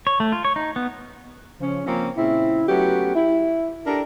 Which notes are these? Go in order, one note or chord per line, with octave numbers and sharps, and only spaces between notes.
C#5
A3
F4
C#5
D#4
B3
C#3 F3 C#4
F3 A#3 C4 C#4
A#2 C#3 C4 E4
F#3 A3 B3 C#4 F#4 G4
E4
D4 G4 A4 A#4